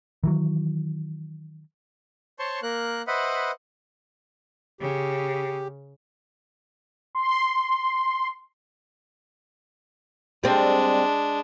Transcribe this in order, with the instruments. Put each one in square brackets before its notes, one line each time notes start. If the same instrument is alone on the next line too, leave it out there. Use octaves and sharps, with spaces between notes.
[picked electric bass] D#3 E3 F#3
[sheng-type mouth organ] C5 C#5 A5 C6 C#6
A#3 A#4 F#6
B4 C5 D#5 E5 F#5 B5
[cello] C#3 [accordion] G4
[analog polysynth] C6
[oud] G3 C4 [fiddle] G#3 D4